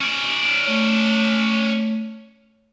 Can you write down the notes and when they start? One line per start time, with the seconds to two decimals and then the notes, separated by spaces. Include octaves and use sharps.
0.01 C#4 D5
0.64 A3 C#5